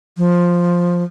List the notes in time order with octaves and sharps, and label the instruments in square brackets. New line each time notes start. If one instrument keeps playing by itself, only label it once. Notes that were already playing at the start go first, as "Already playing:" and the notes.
[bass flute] F3